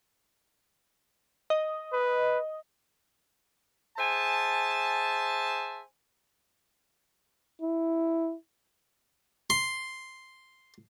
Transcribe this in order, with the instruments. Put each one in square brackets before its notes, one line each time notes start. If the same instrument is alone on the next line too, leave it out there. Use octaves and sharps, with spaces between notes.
[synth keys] D#5
[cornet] B4
[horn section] G#4 C5 E5 G#5 A5
[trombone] E4
[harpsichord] C6